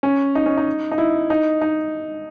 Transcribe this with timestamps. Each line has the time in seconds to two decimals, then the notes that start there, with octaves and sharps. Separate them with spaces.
0.03 C#4
0.35 D#4
0.46 C#4
0.58 D#4
0.92 D#4
0.98 E4
1.30 D#4
1.61 D#4